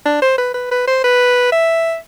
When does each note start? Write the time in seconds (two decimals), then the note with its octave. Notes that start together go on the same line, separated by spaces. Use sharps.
0.06 D4
0.22 C5
0.38 B4
0.54 B4
0.71 B4
0.87 C5
1.04 B4
1.52 E5